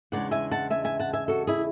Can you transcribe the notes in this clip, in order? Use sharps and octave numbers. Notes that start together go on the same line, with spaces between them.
E2 C#3 G#3 D4 D5 F#5
E5 G#5
F#5 A5
E5 G#5
E5 G#5
F#5 A5
E5 G#5
F#4 A4
E4 G#4